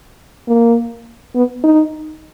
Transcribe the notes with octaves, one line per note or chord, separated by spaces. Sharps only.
A#3
B3
D#4